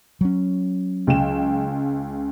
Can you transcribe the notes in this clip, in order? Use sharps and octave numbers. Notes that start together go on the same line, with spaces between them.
F#3 C#4
C#2 G5 E7